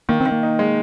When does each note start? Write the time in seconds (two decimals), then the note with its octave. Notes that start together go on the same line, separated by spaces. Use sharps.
0.09 D#3 A#3
0.20 C4
0.26 D#3
0.32 A#3
0.43 D#4
0.59 G#3